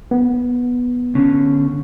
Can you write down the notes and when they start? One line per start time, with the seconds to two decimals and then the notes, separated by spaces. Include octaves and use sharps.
0.11 B3
1.15 D3 C#4